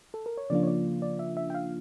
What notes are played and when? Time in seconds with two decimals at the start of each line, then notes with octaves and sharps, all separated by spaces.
0.14 A4
0.26 A#4
0.37 C#5
0.50 C#3 F3 A#3 D4 F4 D5
0.63 C#5
0.67 D5
1.02 D5
1.19 E5
1.37 E5
1.50 G5
1.54 F5